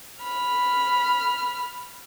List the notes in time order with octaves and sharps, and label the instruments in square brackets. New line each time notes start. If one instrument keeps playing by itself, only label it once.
[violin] B5 F6